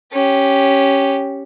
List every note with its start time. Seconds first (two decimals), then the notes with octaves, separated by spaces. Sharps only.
0.13 C#4 G4